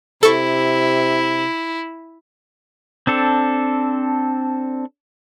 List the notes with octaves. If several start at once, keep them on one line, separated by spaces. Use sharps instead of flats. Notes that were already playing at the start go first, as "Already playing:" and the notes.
C3 E4 A4 C#6
C4 D4 A4